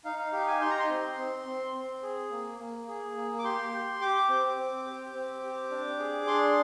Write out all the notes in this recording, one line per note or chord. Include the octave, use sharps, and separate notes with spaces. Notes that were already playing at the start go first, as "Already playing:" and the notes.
D#4 F5
F5
G4 F5
G#5
D#4 C6
A#5
C6
C4
C4
C4
C4
G#4
A#3
A#3
G#4
A#3
D6
G4 C6
G4
G4 D6
C4
C4
G4
C4
G4
D4
G#4
D4 C6